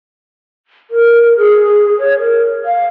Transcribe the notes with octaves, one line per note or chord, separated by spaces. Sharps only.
A#4
G#4
C#5
A#4
F5